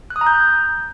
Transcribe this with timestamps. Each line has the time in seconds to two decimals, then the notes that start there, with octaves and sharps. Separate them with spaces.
0.10 F#6
0.16 D#6
0.21 A#5
0.27 G6